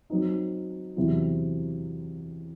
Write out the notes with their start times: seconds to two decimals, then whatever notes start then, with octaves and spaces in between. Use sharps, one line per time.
0.10 F#3 C4 D#4
0.97 E2 C3 F#3 C4 E4